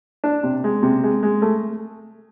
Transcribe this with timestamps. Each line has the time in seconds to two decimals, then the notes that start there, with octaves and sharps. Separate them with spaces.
0.24 D4
0.43 C3
0.64 G#3
0.83 C3
1.03 G#3
1.23 G#3
1.42 A3